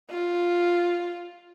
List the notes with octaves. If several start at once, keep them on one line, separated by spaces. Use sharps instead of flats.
F4